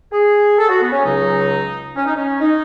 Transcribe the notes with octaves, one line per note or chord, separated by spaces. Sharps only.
G#4
A4
F#4
B3
C#4
C#2 C#3 F#3 D#4
C#4
D#4
C#4
D#4